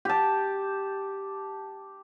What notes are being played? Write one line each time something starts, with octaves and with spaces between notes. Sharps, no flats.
G4 A5